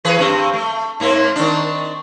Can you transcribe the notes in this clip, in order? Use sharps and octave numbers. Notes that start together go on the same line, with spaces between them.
E3 G#4 B4
G2 C4
A3
G#2 A#3 C4
D#3 C4 D4